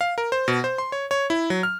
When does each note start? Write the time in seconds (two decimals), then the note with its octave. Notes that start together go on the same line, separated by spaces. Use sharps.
0.01 F5
0.18 A#4
0.32 C5
0.48 B2
0.64 C5
0.78 C6
0.92 C#5
1.11 C#5
1.30 E4
1.50 F#3
1.63 F6